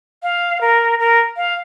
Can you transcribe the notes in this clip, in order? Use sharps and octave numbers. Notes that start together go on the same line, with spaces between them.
F5
A#4
A#4
F5